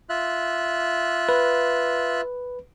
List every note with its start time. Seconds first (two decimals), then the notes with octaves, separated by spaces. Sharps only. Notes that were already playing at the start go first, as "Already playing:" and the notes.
0.09 F4 E5 F#6
1.29 B4